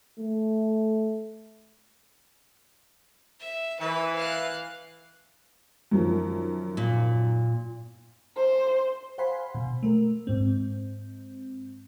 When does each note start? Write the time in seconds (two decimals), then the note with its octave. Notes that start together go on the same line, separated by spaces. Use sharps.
0.19 A3
3.40 E5
3.80 E3 B4
4.15 F5 F#6
5.91 F#2 D#3 F3
6.77 A#2
8.37 C5
9.18 C5 F5 F#5 G#5 B5 C6
9.55 B2
9.83 A3 A#4
10.27 G#2 C4